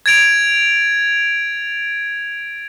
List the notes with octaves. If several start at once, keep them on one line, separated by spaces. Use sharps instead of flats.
G#6 A6 D7 F7